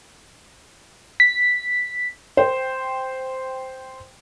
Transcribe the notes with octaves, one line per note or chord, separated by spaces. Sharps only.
B6
C5 G5